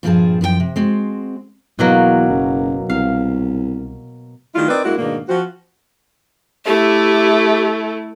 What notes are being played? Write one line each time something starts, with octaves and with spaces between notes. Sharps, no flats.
G2 A#2 F3 C4 G#4 A5
F#2 F3 G#4 G5
C3
G#3 C4 F#4
E2 B2 F#3 A#3
F#1
C2 F5
D#3 G3 A3 E4 F4
C4 D#4 A#4 B4 D5
G2 G#3 A#3 E4 F#4
G#2 B2 D#3 A#3 D4
F3 C4 F#4
A3 E4 G4